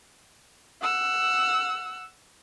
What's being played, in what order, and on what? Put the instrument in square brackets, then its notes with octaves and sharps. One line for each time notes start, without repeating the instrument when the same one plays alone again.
[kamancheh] F#5 E6